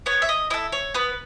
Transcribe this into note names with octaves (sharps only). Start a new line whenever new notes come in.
B3 C#5
E5
D#5
E4 A4 D#5
C#5
B3 B4